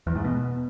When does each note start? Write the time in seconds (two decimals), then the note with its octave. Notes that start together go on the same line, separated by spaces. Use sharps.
0.07 E2
0.16 G#2
0.25 B2